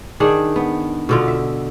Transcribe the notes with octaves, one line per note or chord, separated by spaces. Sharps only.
D#3 D4 G#4
B3
B2 D3 F4
E5